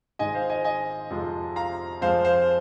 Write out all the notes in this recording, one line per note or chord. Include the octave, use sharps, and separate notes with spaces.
G#1 G#2 G#3 D#5 G#5
C5 F5
D#5 G#5
D#5 G#5
F2 C3 F3 G#3
F5 A#5
F2 F3 G#3 C5 F5
C5 F5